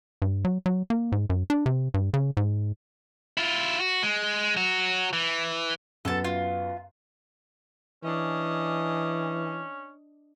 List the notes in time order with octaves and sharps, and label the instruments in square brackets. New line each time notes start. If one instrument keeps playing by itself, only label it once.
[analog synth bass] G2
F#3
F#3
A#3
G#2
F#2
D4
C3
G2
C#3
G#2
[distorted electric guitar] E4 F4
F#4
G#3
F#3 F#4
E3
[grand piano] F#2 B3 [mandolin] A4 A5
[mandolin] F4
[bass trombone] E3 [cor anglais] C#4 [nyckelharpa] D4 D#5